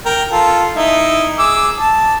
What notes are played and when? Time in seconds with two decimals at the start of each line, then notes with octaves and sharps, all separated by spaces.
0.06 A#4 G5
0.32 F4 A4
0.76 D#4 E4 E5
1.39 G#4 D6 E6
1.79 A5